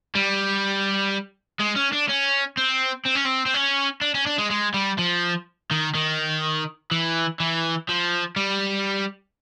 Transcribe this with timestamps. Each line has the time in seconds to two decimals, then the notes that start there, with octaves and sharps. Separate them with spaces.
0.15 G3
1.60 G#3
1.76 C#4
1.93 D4
2.09 C#4
2.57 C4
3.06 C4
3.16 C#4
3.26 C4
3.46 C4
3.54 C#4
4.01 D4
4.15 C#4
4.26 D4
4.38 G#3
4.50 G#3
4.74 G3
4.98 F3
5.71 D#3
5.95 D#3
6.91 E3
7.40 E3
7.89 F3
8.36 G3